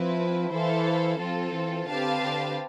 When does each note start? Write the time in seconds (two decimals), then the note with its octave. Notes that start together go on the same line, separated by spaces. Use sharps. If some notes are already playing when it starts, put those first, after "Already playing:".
Already playing: F3 C4 E4 B4
0.49 E3 E4 A4 C5 F5
1.18 F3 C4 F4 A4
1.52 E3
1.86 D3 C4 G4 B4 F5 A5
2.21 D3